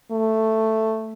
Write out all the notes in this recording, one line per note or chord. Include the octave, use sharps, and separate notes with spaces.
A3